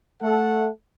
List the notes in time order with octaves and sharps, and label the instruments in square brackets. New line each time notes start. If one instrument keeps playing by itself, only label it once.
[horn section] A3 A4 F#5